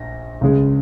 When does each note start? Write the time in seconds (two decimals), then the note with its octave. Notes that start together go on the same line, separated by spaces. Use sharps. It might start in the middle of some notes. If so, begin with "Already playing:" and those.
Already playing: A#1 A#6
0.41 C#2 C#3 G#3